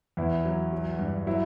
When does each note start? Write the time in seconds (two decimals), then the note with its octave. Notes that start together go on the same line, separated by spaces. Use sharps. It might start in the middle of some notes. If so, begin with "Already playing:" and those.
0.17 E2 E4
0.45 F#3
0.73 F#3
0.99 G2
1.27 F#3 E4